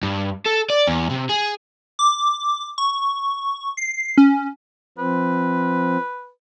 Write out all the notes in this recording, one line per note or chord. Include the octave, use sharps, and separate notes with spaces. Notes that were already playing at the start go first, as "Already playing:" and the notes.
G2
A4
D5
E2
C3
G#4
D6
C#6
C7
C#4
F3 C4 B4